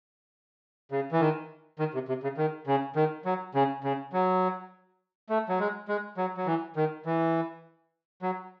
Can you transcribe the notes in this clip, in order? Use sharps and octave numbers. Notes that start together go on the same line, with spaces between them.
C#3
E3
D#3
D#3
C3
C3
C#3
D#3
C#3
D#3
F#3
C#3
C#3
F#3
A3
F#3
G#3
G#3
F#3
F#3
E3
D#3
E3
F#3